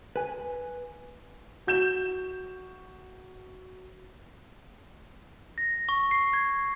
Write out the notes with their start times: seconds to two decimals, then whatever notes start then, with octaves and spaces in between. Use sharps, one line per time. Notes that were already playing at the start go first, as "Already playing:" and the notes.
0.16 B4 G#5
1.67 F#4 G6 E7
5.58 A#6
5.89 C#6
6.11 C7
6.33 G#6